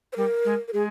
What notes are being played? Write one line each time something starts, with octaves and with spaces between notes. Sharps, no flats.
C5
G3 A#4
G#3
A#4
G#3 G#4